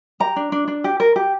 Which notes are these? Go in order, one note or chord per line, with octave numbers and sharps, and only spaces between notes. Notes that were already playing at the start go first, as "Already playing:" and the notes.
G4 A#5
D4
D4
D4
G4
A#4
G4